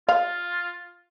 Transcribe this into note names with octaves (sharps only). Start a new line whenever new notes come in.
F4 F5